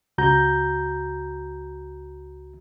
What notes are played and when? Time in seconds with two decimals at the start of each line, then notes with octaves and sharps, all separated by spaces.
0.18 C#2 F#4 A#5 G6